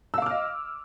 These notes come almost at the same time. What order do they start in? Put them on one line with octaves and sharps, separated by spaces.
E6 F5 D6 F6 D#5